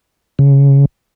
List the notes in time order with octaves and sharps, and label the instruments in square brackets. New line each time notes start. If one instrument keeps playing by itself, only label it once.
[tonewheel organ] C#3